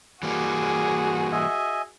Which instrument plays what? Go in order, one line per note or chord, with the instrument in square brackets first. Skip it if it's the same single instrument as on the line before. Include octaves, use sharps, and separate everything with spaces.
[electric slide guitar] E3 G3 A#3 [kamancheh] F#4 G#4 [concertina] D6
[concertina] D#5 E5 G#5